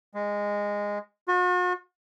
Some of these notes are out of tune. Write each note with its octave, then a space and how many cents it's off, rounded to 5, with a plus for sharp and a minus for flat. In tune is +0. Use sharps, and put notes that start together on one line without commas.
G#3 -15
F#4 -45